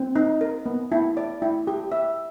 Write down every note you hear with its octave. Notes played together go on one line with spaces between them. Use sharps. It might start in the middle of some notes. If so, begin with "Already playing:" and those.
Already playing: C4
D#4
A#4
B3
E4
D5
E4
G4
E5